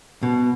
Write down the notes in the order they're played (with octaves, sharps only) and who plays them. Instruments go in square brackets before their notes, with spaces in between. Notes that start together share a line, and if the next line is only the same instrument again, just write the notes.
[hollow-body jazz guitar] B2